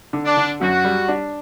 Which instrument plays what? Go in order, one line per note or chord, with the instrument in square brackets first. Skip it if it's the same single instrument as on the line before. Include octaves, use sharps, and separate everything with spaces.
[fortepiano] D3
[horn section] D4
[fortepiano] D3
[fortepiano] F#2 [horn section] F#4
[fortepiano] G3
D4